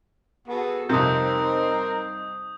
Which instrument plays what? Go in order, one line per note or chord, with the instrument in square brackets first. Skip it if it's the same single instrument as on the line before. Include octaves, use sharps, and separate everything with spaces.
[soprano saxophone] B3 [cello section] F#4 G#4 A4
[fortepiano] F2 C3 [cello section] G3 C4 D#4 [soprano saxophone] A#4 [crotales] D#6 G6